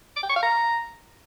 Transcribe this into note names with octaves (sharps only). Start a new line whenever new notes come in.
D6
G5
C#6
F5
A#5